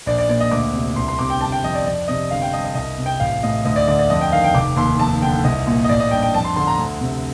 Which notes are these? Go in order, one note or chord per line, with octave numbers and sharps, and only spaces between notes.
A#1 D5
D5
A#2 D5
D#5
D2 D6
C3
C2 C6
C6
C3 D6
G5
G1 A5
G5
F2 D#5
D5
F2 D5
C3 D#5
G1 F5
G5
G2 D#5
D#5
C2 D#5
C3
G5
A1 F5
A2 D#5
D2 D#5
D5
D3 D5
D5
F2 D#5
G5
D#3 F5
G5
F1 D6
D#2 C6
F2 A5
D3 G5
C2 D#5
A#2
D#5
A1 D5
D#5
G2 G5
G5
F2 A5
C6
D3 C6
A#5
D2
C3